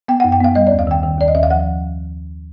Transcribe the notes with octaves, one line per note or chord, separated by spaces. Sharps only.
B3 G5
F#2 F#5
G5
B3 F5
G3 D#5
D#2 D5
F5
D#3 G5
D#3
D#2 D5
D#5
D#2 E5
F5
F3 F#5